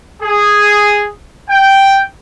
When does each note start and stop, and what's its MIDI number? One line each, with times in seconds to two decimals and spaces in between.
0.22 1.06 68
1.48 1.99 79